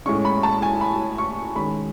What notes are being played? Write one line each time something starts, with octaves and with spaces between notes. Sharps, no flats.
A2 G#3 C#4 C#6
B5
A5
G#5
B5
C#6
D#3 G#3 C#4 B5